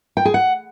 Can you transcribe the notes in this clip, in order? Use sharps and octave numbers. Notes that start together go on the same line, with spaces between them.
G5
G#4
F#5